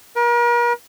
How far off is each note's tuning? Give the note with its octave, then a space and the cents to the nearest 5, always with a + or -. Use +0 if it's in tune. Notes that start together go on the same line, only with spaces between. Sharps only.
A#4 +40